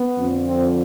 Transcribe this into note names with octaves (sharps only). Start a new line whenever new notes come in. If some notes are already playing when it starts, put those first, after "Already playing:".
Already playing: B3
F2 D3 F3
C4